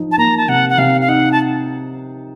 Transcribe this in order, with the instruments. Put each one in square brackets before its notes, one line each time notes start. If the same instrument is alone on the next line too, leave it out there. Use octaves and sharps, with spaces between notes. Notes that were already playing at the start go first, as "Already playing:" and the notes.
Already playing: [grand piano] F3 D#4
[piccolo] A5
[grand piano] A#3 [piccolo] A#5
[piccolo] A5
[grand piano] C3 [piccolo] F#5
[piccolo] F#5
[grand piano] C3 [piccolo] F5
[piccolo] F5
[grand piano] D#4 [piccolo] F#5
[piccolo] A5